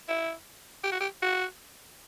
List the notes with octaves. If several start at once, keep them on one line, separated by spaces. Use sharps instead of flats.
E4
G4
F#4
G4
F#4